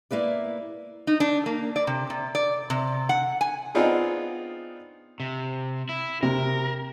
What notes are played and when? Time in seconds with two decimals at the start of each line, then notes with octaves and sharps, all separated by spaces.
0.11 A#3 E4 B4 D5
1.07 D#4
1.20 D4
1.46 A#3
1.76 D5
1.87 C3
2.10 C3
2.35 D5
2.70 C3
3.09 F#5
3.41 G#5
3.75 B3 C4 D4 D#4 F4 G#4
5.20 C3
5.89 E4
6.23 C3 A#4